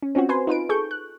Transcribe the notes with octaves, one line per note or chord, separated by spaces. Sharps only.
C#4
C4 C#4 F4 F#4
B4 C5 G#5 C6
D#4 F4 B4 D7
G#4 A4 C#6 G6
F#6